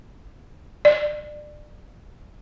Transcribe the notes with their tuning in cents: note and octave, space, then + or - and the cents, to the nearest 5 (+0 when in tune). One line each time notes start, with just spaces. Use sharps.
D5 +25